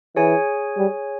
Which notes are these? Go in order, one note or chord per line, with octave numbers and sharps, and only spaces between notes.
E3 G#4 C#5 G#5
G3